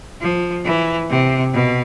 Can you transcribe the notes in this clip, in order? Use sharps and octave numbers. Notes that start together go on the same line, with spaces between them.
F3
E3
C3
B2